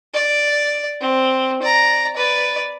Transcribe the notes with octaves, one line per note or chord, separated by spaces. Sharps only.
D5
C4
D5 A#5
B4 D5